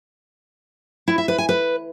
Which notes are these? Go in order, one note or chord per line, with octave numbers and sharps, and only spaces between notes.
E4
E5
B4
G#5
B4